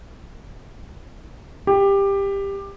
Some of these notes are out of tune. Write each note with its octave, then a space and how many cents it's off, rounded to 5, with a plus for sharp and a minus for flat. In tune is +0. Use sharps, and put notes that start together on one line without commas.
G4 +15